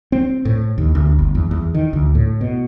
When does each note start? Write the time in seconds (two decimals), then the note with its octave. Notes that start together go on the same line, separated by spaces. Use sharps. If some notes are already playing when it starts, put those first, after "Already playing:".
0.12 C4
0.45 A2
0.78 D#2
0.95 D2
1.19 G1
1.35 E2
1.51 E2
1.74 D#3
1.93 D2
2.15 A2
2.41 B2